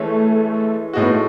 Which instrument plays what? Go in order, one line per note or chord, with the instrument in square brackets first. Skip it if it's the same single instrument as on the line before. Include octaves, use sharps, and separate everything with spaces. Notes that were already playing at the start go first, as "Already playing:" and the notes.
Already playing: [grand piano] E3 G#3 C#4 [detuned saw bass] A3
[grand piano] A2 G#3 D#4 F#4
[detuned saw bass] B3
A3